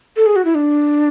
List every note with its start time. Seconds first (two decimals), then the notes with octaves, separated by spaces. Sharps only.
0.17 A4
0.26 G#4
0.36 F#4
0.45 E4
0.55 D4